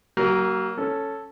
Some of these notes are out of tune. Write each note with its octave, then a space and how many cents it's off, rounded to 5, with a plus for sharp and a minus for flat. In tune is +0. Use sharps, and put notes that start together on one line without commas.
F#3 +35 A#3 +0 A#4 +0
C#4 +0 A4 +0